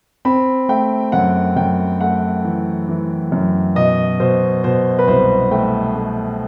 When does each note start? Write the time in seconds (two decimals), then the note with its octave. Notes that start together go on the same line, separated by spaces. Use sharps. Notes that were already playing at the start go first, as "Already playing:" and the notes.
0.25 C4 B5
0.69 A3 G5
1.12 F#2 F#5
1.56 F#2 G5
2.01 A3 F#5
2.44 E3
2.88 E3
3.32 F#2
3.76 B2 D#5
4.20 B2 C5
4.64 B2 C5
4.99 B4
5.08 C2 C5
5.51 A3 G5
5.95 A3